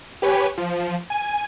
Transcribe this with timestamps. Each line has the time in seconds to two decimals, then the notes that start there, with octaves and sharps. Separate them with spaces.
0.22 G4 B4 C#5 G#5
0.58 F3
1.10 G#5